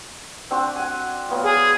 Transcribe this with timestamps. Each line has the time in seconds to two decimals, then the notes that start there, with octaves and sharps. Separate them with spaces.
0.51 C4 D4 F#4
0.76 F#5 G#5
1.29 F#3 B3 F4
1.46 G#4